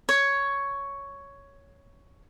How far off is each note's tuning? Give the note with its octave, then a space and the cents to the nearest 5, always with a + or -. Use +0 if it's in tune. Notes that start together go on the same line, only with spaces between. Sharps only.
C#5 +5